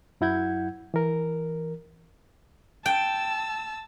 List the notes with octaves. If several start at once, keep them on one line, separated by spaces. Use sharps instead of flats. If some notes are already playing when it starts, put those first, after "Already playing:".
F#2 F#3 E4 F#5 G6 G#6
E3 A#4
G5 A5 E6